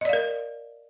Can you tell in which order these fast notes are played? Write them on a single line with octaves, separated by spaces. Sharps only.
D#5 D5 F5 A#4